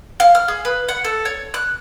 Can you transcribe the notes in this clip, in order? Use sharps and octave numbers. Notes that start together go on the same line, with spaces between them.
F5
F6
G#4
B4
F#5
A4
C#5
F#6